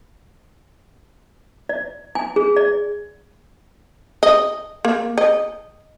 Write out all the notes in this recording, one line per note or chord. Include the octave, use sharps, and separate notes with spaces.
D5
G#5
G#4
D5
D#5
A#3
D#5